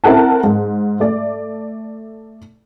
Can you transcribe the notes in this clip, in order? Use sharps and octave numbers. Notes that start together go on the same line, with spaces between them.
C4 E4 A4 A#4 F#5 A5
G#2
A3 D5